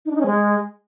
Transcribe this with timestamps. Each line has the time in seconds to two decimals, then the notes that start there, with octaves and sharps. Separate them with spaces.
0.06 D#4
0.11 D4
0.16 D#4
0.21 C#4
0.26 G#3